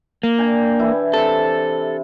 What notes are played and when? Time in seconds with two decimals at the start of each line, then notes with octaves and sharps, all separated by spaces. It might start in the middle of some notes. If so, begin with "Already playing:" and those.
0.23 A#3
0.38 D4 G5 G#5
0.79 E3 E4
1.14 C3 A4